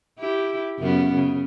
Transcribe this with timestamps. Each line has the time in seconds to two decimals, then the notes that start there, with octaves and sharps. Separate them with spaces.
0.19 E4 G4
0.79 F#2 C#3 B3
1.15 C#3